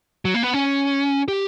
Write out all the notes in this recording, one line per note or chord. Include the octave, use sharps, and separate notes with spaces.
F#3
A#3
B3
C#4
G4